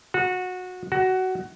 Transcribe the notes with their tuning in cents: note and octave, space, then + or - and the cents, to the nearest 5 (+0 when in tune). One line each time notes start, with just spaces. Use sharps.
F#4 -20
F#4 +15